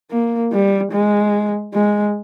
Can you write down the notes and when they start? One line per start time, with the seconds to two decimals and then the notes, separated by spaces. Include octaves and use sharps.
0.11 A#3
0.52 G3
0.92 G#3
1.74 G#3